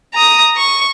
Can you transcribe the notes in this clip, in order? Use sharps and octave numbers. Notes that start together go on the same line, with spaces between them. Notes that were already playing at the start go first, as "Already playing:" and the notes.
A#5 D#6
C#6